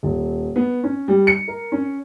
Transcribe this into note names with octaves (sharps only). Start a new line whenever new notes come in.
D#1
B3
C#4
G3
C#7
A#4
C#4